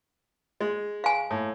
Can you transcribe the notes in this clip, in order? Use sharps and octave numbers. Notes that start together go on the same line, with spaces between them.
G#3
F5 G#5
A2